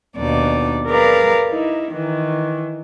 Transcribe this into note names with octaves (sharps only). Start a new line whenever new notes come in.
D#2 B2 D4 D#4 D5
G#4 A#4 B4 D5 F5 A#5
D#4 E4
D#3 E3